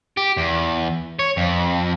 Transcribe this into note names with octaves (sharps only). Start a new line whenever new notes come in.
G4
E2
C#5
F2